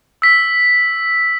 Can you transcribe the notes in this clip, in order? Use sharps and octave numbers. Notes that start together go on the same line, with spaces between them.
E6 B6